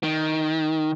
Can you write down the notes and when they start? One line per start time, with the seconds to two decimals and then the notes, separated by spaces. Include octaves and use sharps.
0.03 D#3